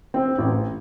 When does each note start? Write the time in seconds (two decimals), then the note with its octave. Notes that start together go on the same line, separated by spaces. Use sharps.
0.14 C4
0.38 A1